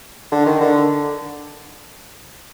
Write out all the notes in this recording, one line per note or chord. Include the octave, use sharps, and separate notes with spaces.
D3
D#3
D3